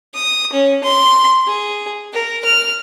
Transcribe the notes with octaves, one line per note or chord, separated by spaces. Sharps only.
D#6
C#4
C6
G#4
A#4
F6